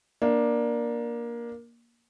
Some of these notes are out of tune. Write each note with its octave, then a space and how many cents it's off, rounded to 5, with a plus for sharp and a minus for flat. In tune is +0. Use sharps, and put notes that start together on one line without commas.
A#3 +15 D4 +5